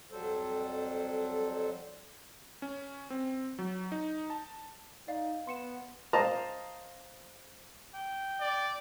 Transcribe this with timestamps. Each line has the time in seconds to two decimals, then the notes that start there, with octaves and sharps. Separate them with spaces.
0.11 F2 F#3 G3 A4 C5
2.62 C#4
3.10 C4
3.59 F#3
3.92 D#4
4.30 A5
5.08 D#4 D5 F5
5.47 B3 C6 C#7 E7
6.13 C5 D#5 F5 A5 A#5
7.94 G5
8.40 D5